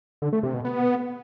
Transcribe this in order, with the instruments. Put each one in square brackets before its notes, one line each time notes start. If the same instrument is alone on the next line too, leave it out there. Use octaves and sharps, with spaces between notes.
[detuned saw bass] D3
A3
C3
B2
B3